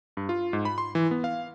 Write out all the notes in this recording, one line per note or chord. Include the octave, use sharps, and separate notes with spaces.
G2
F4
G#2
B5
C6
E3
B3
F5